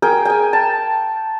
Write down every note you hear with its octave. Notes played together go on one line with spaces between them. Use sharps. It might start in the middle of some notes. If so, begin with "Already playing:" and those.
G#4 A#4 G5
G5 G#5
A5